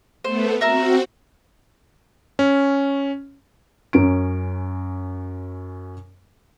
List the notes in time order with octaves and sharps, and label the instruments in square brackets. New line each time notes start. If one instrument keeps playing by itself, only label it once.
[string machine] A3 B3 [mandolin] C5
[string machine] C4 F#4 [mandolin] A#4 E5 A#5
[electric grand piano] C#4
[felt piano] F#2 C#4 D7